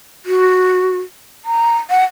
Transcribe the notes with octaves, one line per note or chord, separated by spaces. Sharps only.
F#4
A#5
F#5